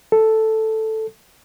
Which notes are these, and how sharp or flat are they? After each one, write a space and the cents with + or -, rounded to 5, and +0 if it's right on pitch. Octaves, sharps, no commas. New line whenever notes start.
A4 +0